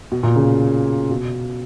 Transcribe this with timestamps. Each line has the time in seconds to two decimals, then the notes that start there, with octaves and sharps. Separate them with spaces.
0.12 B2
0.23 A#2
0.36 C#3
1.10 B2